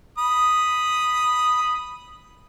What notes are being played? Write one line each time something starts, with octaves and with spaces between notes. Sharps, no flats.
B5 D#6